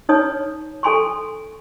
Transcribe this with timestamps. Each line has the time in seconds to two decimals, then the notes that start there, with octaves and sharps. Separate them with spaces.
0.09 D#4 B4 C#5 D#6
0.83 A4 G#5 C6 C#6